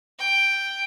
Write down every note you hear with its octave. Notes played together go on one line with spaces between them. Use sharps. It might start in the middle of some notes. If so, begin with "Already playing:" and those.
G5